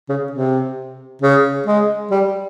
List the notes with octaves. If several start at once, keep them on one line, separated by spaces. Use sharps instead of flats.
C#3
C3
C#3
G#3
G3